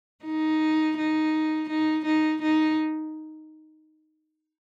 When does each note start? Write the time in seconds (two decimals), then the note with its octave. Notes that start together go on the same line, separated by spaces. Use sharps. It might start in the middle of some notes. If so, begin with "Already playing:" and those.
0.25 D#4
0.97 D#4
1.70 D#4
2.06 D#4
2.42 D#4